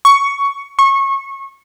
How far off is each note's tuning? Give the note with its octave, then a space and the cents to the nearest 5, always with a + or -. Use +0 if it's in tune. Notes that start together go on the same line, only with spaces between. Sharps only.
C#6 +10
C#6 -25